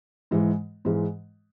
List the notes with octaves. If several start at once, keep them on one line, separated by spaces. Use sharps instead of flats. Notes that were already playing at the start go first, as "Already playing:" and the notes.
G#2 E3 G#3
G#2 E3 G#3